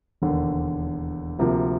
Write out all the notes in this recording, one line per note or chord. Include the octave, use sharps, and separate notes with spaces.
E1 D#2 D3
D2 C3 F3 A#3